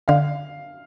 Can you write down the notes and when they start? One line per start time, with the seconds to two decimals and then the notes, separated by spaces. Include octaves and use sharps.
0.08 D3 F5